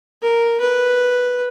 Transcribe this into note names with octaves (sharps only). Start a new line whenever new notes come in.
A#4
B4